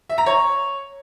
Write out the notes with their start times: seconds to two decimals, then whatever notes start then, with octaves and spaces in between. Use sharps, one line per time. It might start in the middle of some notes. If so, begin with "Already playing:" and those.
0.09 E5
0.18 A#5
0.26 C#5